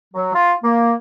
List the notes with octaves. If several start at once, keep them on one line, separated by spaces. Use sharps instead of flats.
F#3
F4
A#3